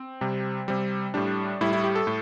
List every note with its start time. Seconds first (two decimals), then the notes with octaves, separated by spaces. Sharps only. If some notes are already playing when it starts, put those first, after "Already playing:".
Already playing: C4
0.21 C3 G3
0.68 C3 G3
1.14 A2 G3 D4
1.61 A2 G3 E4
1.73 E4
1.84 G4
1.96 A4
2.07 A2